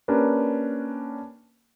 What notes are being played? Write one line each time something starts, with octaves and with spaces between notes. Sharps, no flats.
A#3 C#4 D4 G4 A#4 B4